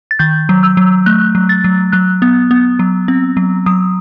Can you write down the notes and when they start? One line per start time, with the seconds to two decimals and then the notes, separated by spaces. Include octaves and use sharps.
0.11 A6
0.19 D#3 G6
0.49 F#3
0.63 E6
0.77 F#3
1.06 A3 F#6
1.35 F#3
1.49 A6
1.64 F#3
1.92 F#3 F#6
2.22 B3
2.51 B3
2.79 F#3
3.08 C4
3.37 F#3
3.66 F#3 D#6